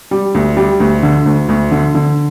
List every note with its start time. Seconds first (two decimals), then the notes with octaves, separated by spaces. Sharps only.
0.11 G3
0.35 D2
0.57 G3
0.80 D2
1.03 D3
1.26 D2
1.49 D2
1.71 D3
1.95 D3